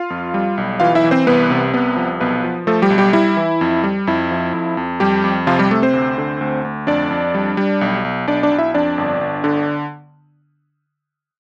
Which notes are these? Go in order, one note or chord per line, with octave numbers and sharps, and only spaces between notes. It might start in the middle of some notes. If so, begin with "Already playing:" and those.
Already playing: F4 F5
F2
G3
B1
E3 F4 F5
E4 E5
E3
C4 C5
C2 B3 B4
C3
C2 B3 B4
F3
B1 B3 B4
F3
F3 A3 A4
G3 G4
B1
G3 G4
G3 E4
E3
F2
G3
F2 E4
F3
F2
F2
F2 G3 G4
F2
C3 F3 F4
G3 G4
C3 A3 A4
C4 C5
D2
D3
D2
D2
F2 D4 D5
F2
G3
G3
B1
B1
B1 D4 D5
D4 D5
B1
E4 E5
F2 D4 D5
G1
G1
D3